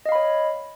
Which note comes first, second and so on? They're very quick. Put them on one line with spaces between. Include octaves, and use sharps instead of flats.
D#5 F5 B5 C#5